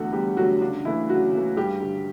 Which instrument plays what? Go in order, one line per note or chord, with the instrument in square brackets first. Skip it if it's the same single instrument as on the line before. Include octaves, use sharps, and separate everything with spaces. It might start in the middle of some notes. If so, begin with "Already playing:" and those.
Already playing: [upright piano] E2 D3 A3 F#4 A4 F#5
E2 G3 G4
D3 F#3 A3 F#4
C#3 D4
E3 A3 E4
C#3 F#3 F#4
E3 A3
G2 G3 G4
D3 G3